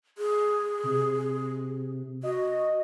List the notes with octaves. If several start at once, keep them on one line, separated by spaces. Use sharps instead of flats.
G#4
C3
F#4 D#5